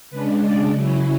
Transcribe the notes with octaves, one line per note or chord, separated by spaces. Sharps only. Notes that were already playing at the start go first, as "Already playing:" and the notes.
C#3 G#3 D4 B4
D5
C#3 F#3 C#4 E4